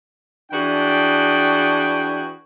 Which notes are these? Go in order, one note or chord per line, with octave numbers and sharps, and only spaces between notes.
E3 D4 F#4 G#4 G5